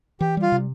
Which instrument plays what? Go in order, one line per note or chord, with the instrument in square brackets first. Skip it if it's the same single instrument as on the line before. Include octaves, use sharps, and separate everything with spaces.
[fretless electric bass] E3 [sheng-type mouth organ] G4
[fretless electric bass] G3 [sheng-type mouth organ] F4
[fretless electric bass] C3